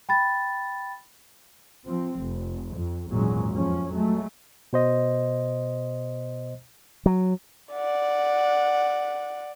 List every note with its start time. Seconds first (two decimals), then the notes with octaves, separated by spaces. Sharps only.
0.09 G5 B5 A6
1.87 F3 C4
2.19 F1
2.75 F2
3.09 G#1 E2 A#2 F#3 G#3 C#4
3.52 F2 F3 C#4
3.90 F#3 G#3 A3
4.73 B2 C5 D#5
7.06 F#3
7.73 D5 F#5